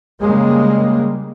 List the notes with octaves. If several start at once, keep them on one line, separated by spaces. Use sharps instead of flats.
C#3 G3 G#3 A#3